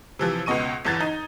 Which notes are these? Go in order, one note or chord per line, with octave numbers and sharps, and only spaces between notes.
C3 E3 F3
C#2 B2 B3 D#5 C#6 D#7
G1 E2 E3 G#6 A6
D#4